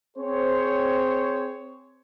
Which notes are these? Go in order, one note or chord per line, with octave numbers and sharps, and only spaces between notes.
C4 G#4 C5 C#5